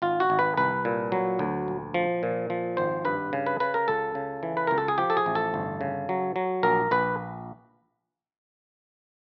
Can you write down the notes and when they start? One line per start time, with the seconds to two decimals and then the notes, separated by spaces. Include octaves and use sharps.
0.02 G#1 F4
0.20 F#4
0.30 G#1
0.39 B4
0.57 C2 B4
0.85 A#2
1.12 F#3
1.39 D2
1.68 A#1
1.94 F3
2.23 A#2
2.50 F3
2.77 G#1 C5
3.05 G2 B4
3.33 C#3
3.46 B4
3.60 C#3 B4
3.74 A#4
3.88 C#2 A4
4.15 C#3
4.43 E3
4.57 B4
4.67 C#2 A#4
4.78 A4
4.88 G#4
4.98 F3 G4
5.10 A4
5.17 G#4
5.26 A1
5.35 A4
5.54 G1
5.81 C#3
6.09 F#3
6.36 F#3
6.63 A#1 A#4
6.91 A#1 B4